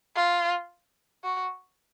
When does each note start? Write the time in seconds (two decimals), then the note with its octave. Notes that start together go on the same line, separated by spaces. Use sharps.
0.16 F4
1.24 F#4